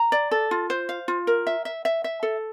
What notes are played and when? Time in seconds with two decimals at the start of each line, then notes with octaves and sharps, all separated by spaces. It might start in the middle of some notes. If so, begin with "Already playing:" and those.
Already playing: A#5
0.12 D5
0.31 A4
0.51 F4
0.70 C5
0.89 F5
1.08 F4
1.27 A#4
1.47 E5
1.65 E5
1.85 E5
2.04 E5
2.23 A4